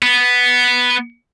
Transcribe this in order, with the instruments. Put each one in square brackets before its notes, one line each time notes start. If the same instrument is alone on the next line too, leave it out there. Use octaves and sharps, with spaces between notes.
[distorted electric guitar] B3